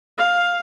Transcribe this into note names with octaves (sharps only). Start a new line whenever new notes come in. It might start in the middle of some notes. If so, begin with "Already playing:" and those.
F5